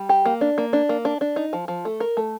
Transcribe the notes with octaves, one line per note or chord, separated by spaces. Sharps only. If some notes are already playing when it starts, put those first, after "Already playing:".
Already playing: G3
G4
A#3
D4
A#3
D4
A#3
D4
D4
D#4
F3
F3
A3
A#4
A3